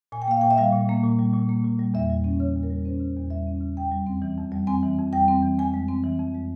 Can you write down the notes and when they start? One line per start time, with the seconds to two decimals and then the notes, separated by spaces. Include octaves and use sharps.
0.12 A#2 G#5
0.22 G5
0.28 A#3 F5
0.41 A#2 G5
0.51 E5
0.58 G3 F5
0.73 A#2
0.89 A#3
1.03 A#2
1.19 G3
1.33 A#2
1.49 A#3
1.64 A#2
1.79 G3
1.94 E2 E5
2.10 G3
2.24 C#4
2.39 C#3 C#5
2.56 E2
2.63 A#4
2.70 G3
2.85 C#4 C5
3.00 C#3
3.16 E2
3.30 G3 E5
3.47 C#4
3.61 C#3
3.77 F2 G5
3.91 G3
4.07 C4
4.22 E3
4.38 F2
4.52 G3
4.67 C4 G#5
4.83 E3
4.98 F2
5.13 G3 G5
5.28 C4
5.43 E3
5.58 F2 G#5
5.74 G#3
5.88 C4
6.04 E3
6.19 F2
6.34 G#3